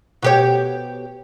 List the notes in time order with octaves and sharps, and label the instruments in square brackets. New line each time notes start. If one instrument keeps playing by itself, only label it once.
[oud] B2 G4 C#5